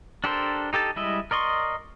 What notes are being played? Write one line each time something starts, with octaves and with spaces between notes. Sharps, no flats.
D4 G4 A4 A#4 C5
D#4 G4 A4 A5
G3 G#3 E4 D#5 E5
A#4 D5 D#5 C6 C#6